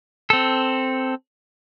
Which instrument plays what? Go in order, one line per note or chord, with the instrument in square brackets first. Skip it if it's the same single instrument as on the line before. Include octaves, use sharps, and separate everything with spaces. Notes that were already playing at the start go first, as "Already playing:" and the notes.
[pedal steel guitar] C4 A4